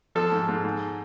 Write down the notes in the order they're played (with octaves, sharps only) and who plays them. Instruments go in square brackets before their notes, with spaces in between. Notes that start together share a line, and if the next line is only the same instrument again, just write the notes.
[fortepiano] F3 A4
G#2
G#2
G#2